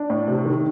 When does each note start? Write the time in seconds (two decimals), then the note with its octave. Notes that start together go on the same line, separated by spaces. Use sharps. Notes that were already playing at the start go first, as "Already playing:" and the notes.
Already playing: D4
0.10 A2
0.28 C3
0.45 D#3